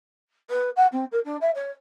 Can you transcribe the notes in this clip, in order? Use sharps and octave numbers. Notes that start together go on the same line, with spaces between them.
B4
F#5
C4
A#4
D4
E5
C#5